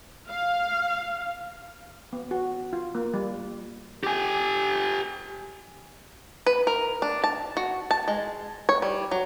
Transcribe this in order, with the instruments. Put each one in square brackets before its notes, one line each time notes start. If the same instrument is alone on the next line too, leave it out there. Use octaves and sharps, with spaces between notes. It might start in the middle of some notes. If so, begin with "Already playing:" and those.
[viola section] F5
[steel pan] B3
F#4
F4
A#3
G3
[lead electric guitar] G4 G#5
[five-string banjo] B4
A#4
D4
A5
F#4
A5
G#3
C#5
G3
F#3